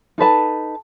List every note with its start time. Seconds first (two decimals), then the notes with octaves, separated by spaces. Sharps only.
0.18 D#4 A4 B4 A5